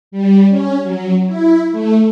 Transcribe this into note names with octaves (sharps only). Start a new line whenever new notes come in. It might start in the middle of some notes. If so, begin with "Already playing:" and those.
G3
C#4
F#3
E4
A3